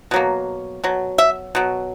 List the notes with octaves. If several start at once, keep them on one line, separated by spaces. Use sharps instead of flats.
B2 F#3 A#3
B2 F#3
E5
B2 F#3